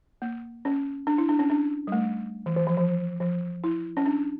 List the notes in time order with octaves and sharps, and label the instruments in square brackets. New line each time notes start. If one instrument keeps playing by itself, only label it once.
[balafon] A#3
C#4
D4
E4
D4
C#4
D4
G3
A3
E3
E3
F3
F3
F3
E4
C#4
D4